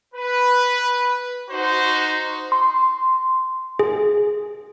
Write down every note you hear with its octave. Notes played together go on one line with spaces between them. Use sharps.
B4
D#4 F#4 C5
C6
G#4